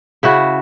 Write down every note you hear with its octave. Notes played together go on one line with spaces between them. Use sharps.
C#3 E4 F#4